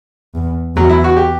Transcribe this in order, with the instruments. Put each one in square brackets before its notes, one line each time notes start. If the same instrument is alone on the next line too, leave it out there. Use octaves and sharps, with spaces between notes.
[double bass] E2
[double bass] E2 [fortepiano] F#3
[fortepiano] E4
F#4
G4